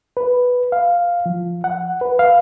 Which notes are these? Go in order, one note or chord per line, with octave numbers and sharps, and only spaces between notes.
B4
F5
F3
F#5
B4
F5